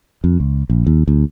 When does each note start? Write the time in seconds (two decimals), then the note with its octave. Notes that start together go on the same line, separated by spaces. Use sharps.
0.24 F2
0.40 C#2
0.70 A#1
0.87 D#2
1.08 D2